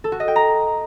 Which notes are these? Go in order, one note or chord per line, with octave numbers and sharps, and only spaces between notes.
A4
F#4
D#5
G5
A#5